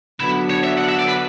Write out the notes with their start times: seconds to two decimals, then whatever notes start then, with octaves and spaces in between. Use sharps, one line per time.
0.20 D3 F#3 B3 D4 E4 F#4
0.50 C#5
0.64 E5
0.78 F#5
0.89 E5
0.99 D5
1.08 B4